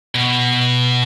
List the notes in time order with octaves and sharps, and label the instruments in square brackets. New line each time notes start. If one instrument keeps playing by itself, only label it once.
[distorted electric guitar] B2